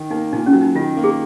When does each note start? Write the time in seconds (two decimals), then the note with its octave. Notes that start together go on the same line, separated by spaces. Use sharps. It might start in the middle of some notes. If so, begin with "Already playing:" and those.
Already playing: D#3
0.10 A#3 D#4
0.33 A#2 D#4
0.46 C#4
0.53 F#3
0.61 D#4
0.75 D#3 F4
0.97 A#3
1.04 G#4